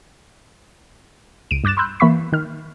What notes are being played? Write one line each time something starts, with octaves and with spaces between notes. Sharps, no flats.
C#2 D7 D#7
G2 D6 F#6 A6 E7
B5 C6 E6 F#6 G6
E3 A#3 E5 B5 C#6 B6
D#3 F6